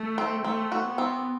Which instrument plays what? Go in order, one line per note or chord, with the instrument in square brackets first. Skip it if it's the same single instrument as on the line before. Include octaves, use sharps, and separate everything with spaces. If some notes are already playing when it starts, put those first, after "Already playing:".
Already playing: [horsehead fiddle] A3
[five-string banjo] C4
[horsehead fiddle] A3 [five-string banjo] C4
[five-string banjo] F#4
[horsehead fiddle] B3
[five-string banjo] C4